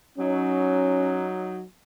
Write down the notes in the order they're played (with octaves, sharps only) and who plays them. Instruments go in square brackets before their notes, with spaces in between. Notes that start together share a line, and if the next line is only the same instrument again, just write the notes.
[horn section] F#3 D#4 [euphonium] C#4